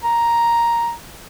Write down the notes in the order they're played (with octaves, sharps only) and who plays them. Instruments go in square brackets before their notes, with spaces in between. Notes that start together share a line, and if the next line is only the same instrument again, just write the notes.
[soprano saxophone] A#5